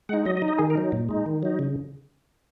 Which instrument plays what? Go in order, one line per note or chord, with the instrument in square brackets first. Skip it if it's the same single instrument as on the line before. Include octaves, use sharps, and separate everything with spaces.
[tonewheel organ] G#3 F#5
D#4
F#3 D#5
D#5
D#4
D#5
D#3 G#4
A#4
F#3 D#4
A#2
G#3 D#4
D#3
F#3 D#4
C#3